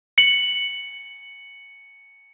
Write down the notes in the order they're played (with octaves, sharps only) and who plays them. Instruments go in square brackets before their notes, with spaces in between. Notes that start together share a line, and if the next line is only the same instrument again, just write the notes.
[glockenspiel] C#7 F#7